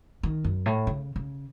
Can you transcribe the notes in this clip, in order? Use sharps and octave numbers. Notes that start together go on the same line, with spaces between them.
D#3
F#2
A2
C#3
C#3